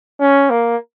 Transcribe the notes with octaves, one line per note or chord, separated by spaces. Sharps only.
C#4
A#3